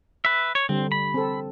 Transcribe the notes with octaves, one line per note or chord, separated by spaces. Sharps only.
B4 E5
C#5
D3 G3 C4
B5
C4 A4